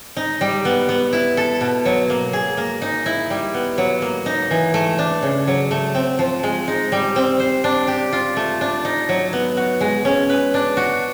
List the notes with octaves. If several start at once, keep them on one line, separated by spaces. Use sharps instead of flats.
D#4
G3
B3
B3
E4
A4
B2
F#3
A#3
G#4
A#3
D#4
E4
G3
B3
F#3
A#3
D#4
E3
A3
D4
C#3
F#3
A3
C4
F3
G#3
D#4
G3
C4
C5
D4
G4
F4
A3
D4
D#4
F#3
B3
F#4
G#3
C#4
B4
D4
F#4